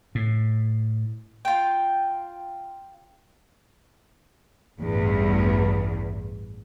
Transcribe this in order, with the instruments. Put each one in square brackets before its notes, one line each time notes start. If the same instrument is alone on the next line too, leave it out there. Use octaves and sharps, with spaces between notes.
[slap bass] A2
[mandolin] F4 G5
[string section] A1 E2 G2